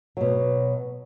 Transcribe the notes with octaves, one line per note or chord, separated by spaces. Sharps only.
B2 F#3